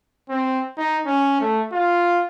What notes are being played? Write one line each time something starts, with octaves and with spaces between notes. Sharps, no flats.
C4
D#4
C#4
A3
F4